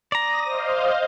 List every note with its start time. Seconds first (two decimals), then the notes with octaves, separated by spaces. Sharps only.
0.12 D5 A#5 D#6 A#6
0.44 C5 D#5 F5